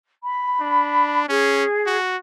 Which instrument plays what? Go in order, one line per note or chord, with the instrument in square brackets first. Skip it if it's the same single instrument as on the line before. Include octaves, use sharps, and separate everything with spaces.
[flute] B5
[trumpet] D4
[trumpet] C#4 [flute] G#4
[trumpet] F#4